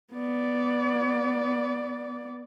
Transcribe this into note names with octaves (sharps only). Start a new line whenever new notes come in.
B3 D5